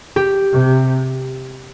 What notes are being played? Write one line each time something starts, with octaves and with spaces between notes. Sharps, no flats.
G4
C3